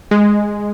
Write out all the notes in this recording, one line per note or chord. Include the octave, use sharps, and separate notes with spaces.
G#3